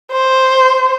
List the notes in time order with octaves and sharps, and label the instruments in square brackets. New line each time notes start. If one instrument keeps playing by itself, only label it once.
[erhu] C5